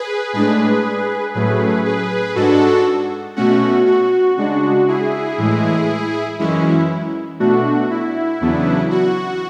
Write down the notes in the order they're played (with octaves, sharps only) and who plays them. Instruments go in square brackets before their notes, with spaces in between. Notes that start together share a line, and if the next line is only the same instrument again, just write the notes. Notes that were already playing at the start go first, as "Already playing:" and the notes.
Already playing: [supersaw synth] G#4 B4
A2 G#3 D4 G#4 B4
A2 F#3 A3 C#4 G#4 B4
G#4 B4
G#2 G#3 D4 F#4 A4
B2 A3 C#4 F#4
F#4
C#3 G#3 D4 F#4
E4 G#4
A2 E3 G#3
F#2 E3 G#3 C#4 E4
B2 A3 D4 F#4
E4
E2 C#3 F#3 B3 D4
F#4